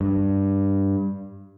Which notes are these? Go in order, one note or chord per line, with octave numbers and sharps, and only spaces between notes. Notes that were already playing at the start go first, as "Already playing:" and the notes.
G2